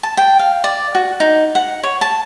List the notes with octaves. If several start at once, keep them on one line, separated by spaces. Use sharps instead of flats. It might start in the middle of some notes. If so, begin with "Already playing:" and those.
A5
G5
F5
D5
F#4
D#4
F#5
C#5
A5